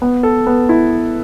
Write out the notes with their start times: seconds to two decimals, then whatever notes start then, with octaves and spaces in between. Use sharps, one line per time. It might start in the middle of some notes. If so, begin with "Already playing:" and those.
0.02 B3
0.23 A4
0.47 B3
0.69 E4